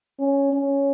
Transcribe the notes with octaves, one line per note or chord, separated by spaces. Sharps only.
C#4
C#4